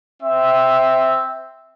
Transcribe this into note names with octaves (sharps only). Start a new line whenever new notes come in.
C4 E5